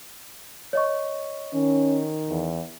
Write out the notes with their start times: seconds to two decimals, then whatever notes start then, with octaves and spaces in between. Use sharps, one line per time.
0.73 C#5 D#5 C#6
1.54 D#3 C#4
2.30 E2